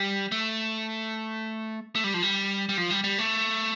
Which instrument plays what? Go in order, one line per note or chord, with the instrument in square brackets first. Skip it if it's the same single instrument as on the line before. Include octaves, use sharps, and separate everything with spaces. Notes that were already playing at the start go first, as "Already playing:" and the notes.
Already playing: [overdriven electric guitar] G3
A3
A3
G3
F3
G3
G3
F3
G3
G3
A3